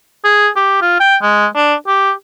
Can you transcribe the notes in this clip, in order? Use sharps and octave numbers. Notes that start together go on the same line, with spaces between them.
G#4
G4
F4
G5
G#3
D4
G4